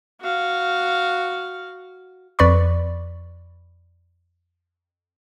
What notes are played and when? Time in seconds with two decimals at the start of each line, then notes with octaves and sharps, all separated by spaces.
0.21 F#4 F5
2.39 F2 B4 D5 B5 C#6